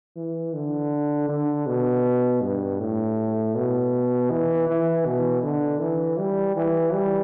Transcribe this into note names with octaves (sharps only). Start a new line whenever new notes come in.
E3
D3
D3
B2
G2
A2
B2
E3
E3
B2
D3
E3
G3
E3
G3